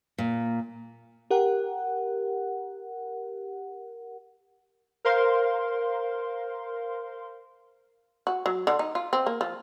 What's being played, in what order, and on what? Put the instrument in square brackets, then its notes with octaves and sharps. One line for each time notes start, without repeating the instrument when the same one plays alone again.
[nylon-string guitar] A#2
[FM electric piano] G4 A#4 F#5
[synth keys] A#4 C5 F5 C6
[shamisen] F#4
F#3
D3
D#4
F4
C4
A#3
F3